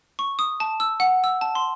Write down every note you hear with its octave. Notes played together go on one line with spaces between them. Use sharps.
C#6
D#6
A5
E6
F#5
E6
A5
C6